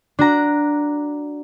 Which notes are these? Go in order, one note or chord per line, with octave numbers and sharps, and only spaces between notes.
D4 F#4 A#5